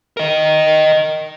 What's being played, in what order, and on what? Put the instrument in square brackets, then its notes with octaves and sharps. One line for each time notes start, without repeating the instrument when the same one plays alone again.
[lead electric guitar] A#4 D#5